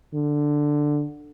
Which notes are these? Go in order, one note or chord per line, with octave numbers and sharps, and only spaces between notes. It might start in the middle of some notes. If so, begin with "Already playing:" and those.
D3